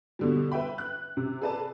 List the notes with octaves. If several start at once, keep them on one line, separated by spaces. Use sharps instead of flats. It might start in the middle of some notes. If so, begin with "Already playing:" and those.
B2 D3 G3
B4 E5 G5 B5
F#6
C3
G#4 A4 B4 D5 A5